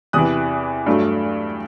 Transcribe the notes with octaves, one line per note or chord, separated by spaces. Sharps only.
E2 C3 E3 D#6 F#6
G2 F#3 A3